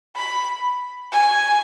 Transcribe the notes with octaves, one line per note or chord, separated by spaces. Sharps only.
B5
G#5